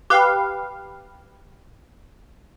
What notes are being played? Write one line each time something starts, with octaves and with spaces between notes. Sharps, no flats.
G4 B4 F5